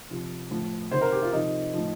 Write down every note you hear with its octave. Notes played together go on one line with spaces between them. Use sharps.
C3 F3
A2 F3
C3 D#3 C5
A#4
G4
F4
C3 F3 D#4
A2 F3